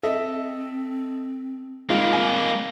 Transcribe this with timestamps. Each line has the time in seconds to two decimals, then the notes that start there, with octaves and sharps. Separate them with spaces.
0.03 C4 A4 D#5 E5
1.90 G3 G#3 A#3 C4 D#4 F4
2.13 G#5